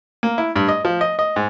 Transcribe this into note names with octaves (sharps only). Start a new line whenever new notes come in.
A#3
E4
G2
D#5
F3
D#5
D#5
G#2